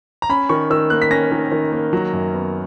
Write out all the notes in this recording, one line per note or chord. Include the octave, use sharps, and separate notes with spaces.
A#5
C#4 B5
D#3 C#6
D#3 E6
A#3 F#6
B6
C#4 A#6
D#3
D#3
A#3
F#3
F#2
B3